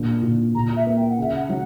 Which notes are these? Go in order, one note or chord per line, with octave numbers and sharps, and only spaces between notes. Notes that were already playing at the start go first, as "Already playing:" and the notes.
Already playing: A#2 D3
A#2
A#2 A#5
E5
A#3
G5
F#5
C#3 E5
F#5
F#3